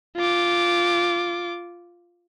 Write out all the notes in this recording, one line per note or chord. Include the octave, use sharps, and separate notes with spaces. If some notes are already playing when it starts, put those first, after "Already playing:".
F4 D6